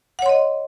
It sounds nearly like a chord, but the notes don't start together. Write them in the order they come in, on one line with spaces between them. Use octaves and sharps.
F#5 C#5 C6 D#5